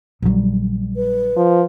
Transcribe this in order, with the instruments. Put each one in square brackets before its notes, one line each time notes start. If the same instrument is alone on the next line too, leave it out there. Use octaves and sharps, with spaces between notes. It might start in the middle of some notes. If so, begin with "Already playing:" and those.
[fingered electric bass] A#1 F#3 [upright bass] D3 G3
[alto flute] B4
[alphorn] F3